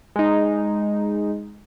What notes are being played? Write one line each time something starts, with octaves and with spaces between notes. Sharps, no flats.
G#3 D#4